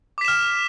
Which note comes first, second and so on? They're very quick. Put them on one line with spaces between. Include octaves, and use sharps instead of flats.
D6 B6 E7 F6